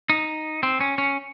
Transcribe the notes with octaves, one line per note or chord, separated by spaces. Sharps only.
D#4
C4
C#4
C#4